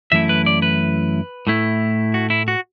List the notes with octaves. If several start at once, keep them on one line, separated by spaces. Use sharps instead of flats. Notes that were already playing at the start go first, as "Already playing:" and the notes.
F#2 E3 A3 E4 E5
B4
D5
B4
A2 A3 E4
F#4
E4
F#4